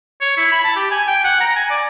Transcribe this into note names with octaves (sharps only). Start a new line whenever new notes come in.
C#5
E4
B5
A5
G4
G#5
G5
F#5
A#5
G#5
D5